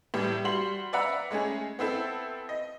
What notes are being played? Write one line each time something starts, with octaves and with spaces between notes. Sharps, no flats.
A2 E3 G3
G3 F#4 C6 F#7
B4 D5 E5 F#5 A#5 B5
G#3 A3 C#4 G#4
B3 C4 E4 A4
D#5